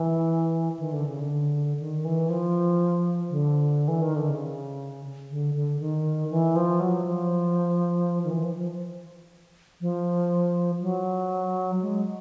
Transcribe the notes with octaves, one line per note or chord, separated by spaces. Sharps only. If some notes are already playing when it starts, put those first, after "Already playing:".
Already playing: E3
D#3
D3
C#3
D3
D#3
E3
F3
D3
E3
D#3
D3
C#3
D3
D3
D#3
E3
F3
F#3
F3
D#3
E3
F3
F3
F3
F#3
G#3